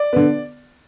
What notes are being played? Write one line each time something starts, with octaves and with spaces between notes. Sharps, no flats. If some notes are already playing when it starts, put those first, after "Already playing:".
Already playing: D5
D3 B3